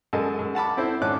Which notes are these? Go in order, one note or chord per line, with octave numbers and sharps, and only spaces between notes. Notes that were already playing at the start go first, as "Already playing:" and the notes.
F#2 G#3 A4 D#5
F#2
F#5 A5 B5 D6
C4 E4 A4 C5
G#2 C#4 D#5 A5 D6 F#6